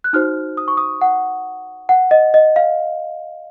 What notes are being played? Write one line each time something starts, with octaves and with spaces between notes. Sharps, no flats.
F#6
D#4 F#4 C5 F6
D#6
C#6
D#6
F#5
F#5
D#5
D#5
F5